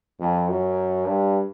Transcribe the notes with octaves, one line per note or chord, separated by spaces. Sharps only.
F2
F#2
G2